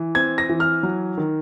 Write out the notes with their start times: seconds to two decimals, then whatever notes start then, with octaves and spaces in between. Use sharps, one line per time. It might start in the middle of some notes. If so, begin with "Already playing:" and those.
Already playing: E3
0.15 C4 G#6
0.38 A#6
0.49 E3
0.60 F6
0.83 F#3
1.17 D#3